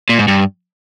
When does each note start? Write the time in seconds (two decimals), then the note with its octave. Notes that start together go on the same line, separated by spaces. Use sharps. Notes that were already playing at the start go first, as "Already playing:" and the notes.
0.09 A#2
0.19 G#2
0.28 G2